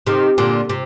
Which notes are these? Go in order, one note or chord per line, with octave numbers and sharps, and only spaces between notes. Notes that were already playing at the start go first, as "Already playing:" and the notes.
C3 D#3
A#2 D3
C3